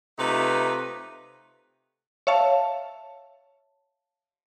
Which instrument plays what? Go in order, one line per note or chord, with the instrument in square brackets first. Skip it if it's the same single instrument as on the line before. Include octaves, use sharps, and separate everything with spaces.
[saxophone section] C3 A3 D#4 F4 B4
[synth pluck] C#5 E5 F5 A5